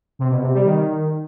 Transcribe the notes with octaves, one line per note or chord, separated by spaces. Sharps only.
C3
B2
C3
G3
D#3